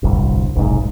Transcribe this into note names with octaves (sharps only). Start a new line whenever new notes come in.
D1 G1 C2
F1 B1 G#2